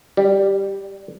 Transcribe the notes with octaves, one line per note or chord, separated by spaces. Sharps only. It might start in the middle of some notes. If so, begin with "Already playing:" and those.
G3